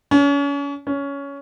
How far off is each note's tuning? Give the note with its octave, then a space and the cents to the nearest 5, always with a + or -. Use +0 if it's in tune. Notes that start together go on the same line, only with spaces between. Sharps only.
C#4 +35
C#4 +15